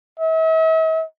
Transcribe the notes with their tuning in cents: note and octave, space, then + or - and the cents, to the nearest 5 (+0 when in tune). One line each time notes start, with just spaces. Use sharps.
E5 -45